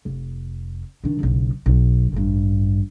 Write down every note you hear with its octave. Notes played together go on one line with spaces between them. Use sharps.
F1
D#3 D4
F#1 B1
B1
A1 G2